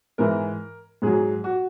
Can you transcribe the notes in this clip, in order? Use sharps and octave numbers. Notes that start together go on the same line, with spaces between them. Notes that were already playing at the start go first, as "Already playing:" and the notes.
G#2 E3 A#4
G#2 F#3 G#4
F#4